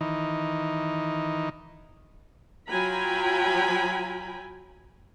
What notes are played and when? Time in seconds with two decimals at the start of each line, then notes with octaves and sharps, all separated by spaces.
0.01 D#3 E3 D#4
2.68 F#3 F4 G5 G#5 A#5 B5